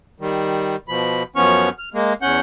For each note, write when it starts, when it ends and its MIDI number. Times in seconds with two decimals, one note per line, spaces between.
0.20 0.76 51
0.20 0.76 55
0.88 1.23 47
0.88 1.23 53
0.88 1.23 83
1.36 1.69 42
1.36 1.69 53
1.36 1.69 59
1.36 1.69 61
1.36 1.69 85
1.36 1.69 89
1.78 1.89 89
1.94 2.13 56
1.94 2.13 58
2.22 2.40 40
2.22 2.40 61
2.22 2.40 78
2.22 2.40 91